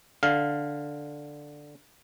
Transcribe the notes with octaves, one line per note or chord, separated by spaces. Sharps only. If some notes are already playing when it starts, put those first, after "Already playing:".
D3 F5